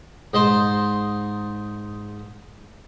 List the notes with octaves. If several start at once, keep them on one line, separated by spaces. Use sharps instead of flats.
G#2 D#4 C5 C6